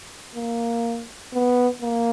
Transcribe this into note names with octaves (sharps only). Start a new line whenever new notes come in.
A#3
B3
A#3